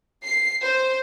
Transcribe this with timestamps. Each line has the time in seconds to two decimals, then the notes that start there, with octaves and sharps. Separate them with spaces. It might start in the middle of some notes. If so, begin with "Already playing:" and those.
0.24 C7
0.64 C5